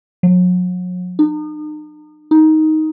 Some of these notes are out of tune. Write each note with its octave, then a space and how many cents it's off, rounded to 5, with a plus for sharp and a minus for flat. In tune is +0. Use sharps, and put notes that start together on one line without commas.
F#3 -40
D#4 -40
D#4 +10